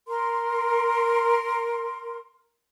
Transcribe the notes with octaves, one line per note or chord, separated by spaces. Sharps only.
A#4 C6